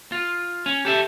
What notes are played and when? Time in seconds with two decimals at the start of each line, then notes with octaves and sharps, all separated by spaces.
0.12 F4
0.66 C#4
0.85 G4 A4 E5